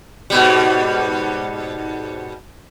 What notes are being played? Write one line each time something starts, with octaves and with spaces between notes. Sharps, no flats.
G#2 B2 G3